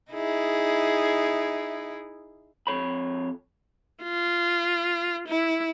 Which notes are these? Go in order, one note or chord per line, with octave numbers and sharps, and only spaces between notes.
D#4 E4 G#4
F2 G#2 C#5 B5
F4
E4